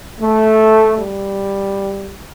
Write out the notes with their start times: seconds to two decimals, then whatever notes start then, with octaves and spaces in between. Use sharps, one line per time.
0.20 A3
0.96 G3